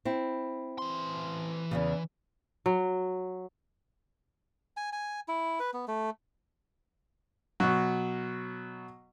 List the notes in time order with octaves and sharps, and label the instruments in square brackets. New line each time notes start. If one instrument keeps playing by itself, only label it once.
[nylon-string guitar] C4 E4
[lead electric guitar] E3 C6
[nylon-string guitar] E2 G2 C#3
[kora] F#3
[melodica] G#5
G#5
E4
B4
B3
A3
[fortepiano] B2 F#3